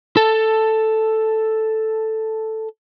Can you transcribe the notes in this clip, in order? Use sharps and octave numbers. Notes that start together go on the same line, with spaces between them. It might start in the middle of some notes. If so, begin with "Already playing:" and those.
A4 A5